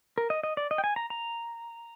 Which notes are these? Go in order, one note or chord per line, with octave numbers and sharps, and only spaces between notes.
A#4
D#5
D#5
D5
D#5
G5
G#5
A#5
A#5